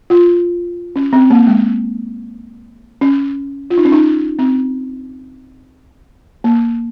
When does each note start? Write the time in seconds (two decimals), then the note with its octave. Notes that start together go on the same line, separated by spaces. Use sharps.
0.10 F4
0.96 C#4
1.13 C4
1.30 A#3
1.47 G#3
3.01 C#4
3.70 F4
3.78 D#4
3.85 C#4
3.92 D#4
4.39 C4
6.44 A#3